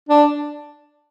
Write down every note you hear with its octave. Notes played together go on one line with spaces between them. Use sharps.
D4